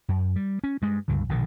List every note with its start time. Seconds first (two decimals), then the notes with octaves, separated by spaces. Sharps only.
0.09 F#2
0.36 G3
0.64 C#4
0.82 G2 G#3
1.08 C#2 G2 D3
1.29 A#1 B2 D3 D#3